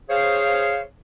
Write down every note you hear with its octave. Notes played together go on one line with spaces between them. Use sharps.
G#4 C5 C#5 F5